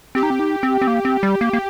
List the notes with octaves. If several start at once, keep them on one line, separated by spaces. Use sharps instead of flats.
C4 G4
D#4
C4
D#4
C4
C4
A#3
C4
G3
A#3
A#3